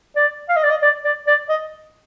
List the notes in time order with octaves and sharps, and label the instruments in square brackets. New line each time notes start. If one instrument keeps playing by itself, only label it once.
[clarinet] D5
F5
D#5
D5
D#5
D5
D5
D5
D#5